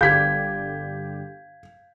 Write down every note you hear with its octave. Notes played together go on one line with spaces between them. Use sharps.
G1 D3 G4 F5 G6 G#6 B6